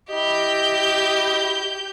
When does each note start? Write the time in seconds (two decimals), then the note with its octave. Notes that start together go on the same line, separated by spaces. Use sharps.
0.11 E4 G4 D#5 G6